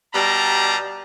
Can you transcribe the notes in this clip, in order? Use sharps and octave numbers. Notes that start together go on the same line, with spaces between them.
B2 G3 G4 A5 A#5